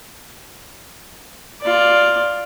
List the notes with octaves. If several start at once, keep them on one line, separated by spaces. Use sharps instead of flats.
F4 D5